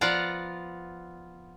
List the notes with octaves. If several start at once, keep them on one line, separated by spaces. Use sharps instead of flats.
F3 B3 F4 D5 F#5 A#5